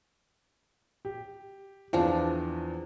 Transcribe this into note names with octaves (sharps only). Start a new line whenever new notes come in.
G4
E2 F3 C4 D4 E4 A5